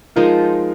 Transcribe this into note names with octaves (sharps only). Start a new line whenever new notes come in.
F3 G#3 D#4 F4 A#4 C5